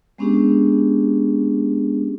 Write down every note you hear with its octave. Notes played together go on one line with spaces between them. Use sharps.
G#3 B3 C#4 D4 G4 G#4